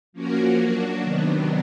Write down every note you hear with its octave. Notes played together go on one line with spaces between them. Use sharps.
F3 A#3 C#4 F#4 A#4
F#3 A#3 D4 F#4
C3 D#3 F#3 B3 D4